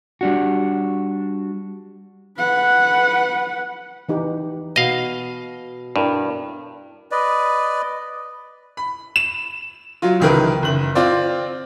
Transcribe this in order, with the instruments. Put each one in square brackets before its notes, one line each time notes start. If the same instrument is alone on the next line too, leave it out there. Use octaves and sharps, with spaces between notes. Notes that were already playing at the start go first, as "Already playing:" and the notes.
[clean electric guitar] G3 D4 F#4
[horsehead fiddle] B4 F#5
[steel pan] E3 D#4 G4
[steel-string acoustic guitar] B2 [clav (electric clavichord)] D#5 F5
[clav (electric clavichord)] G2 [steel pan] D4 E4 A#4
[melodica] B4 D5 D#5
[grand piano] B5
E7
F#3 F4
C#2 C3 D#3 E3 A#4 B4
F#1 F#7
C4 F4 D5